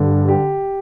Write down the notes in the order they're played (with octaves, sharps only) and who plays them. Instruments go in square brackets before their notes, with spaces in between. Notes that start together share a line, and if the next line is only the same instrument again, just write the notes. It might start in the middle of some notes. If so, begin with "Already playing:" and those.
Already playing: [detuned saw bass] G2 [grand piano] D3
[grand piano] G4